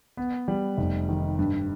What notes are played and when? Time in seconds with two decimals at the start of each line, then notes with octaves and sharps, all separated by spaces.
0.17 B3
0.48 G3
0.77 F1
1.09 D#3
1.39 G2